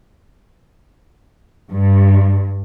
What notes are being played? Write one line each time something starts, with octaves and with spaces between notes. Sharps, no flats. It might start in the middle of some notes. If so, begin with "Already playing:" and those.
G2